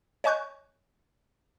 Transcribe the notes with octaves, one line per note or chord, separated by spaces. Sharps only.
C#5 D#5 G#5 C#6 F#6 G6